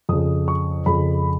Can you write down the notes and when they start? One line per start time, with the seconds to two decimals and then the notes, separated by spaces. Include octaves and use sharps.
0.09 F2 C#3 D#6
0.48 C#6
0.86 F2 C#3 B5